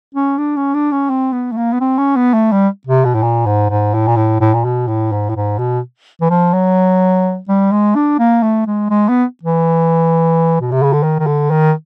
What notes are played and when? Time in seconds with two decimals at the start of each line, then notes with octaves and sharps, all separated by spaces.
0.15 C#4
0.38 D4
0.56 C#4
0.74 D4
0.92 C#4
1.09 C4
1.32 B3
1.52 A3
1.57 A#3
1.73 B3
1.81 C4
1.98 C#4
2.16 B3
2.33 A3
2.52 G3
2.87 C3
3.05 B2
3.15 A2
3.23 A#2
3.46 G#2
3.70 G#2
3.94 A2
4.07 A#2
4.16 A2
4.40 A2
4.54 A#2
4.64 B2
4.87 A2
5.12 G#2
5.29 A2
5.36 G#2
5.59 B2
6.21 E3
6.30 F3
6.53 F#3
7.48 G3
7.72 G#3
7.95 D4
8.19 A#3
8.43 A3
8.66 G#3
8.90 G#3
9.08 B3
9.43 E3
10.61 B2
10.72 C3
10.83 C#3
10.93 D3
11.03 D#3
11.19 D#3
11.26 D3
11.51 D#3